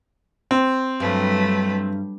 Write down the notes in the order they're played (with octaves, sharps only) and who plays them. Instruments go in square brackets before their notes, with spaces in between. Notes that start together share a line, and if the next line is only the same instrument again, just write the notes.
[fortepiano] C4
[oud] G2 [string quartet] F#3 A3 B4